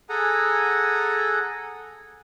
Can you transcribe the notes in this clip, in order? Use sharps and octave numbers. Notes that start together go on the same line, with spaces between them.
G#4 A4 F#5 G#5 A#5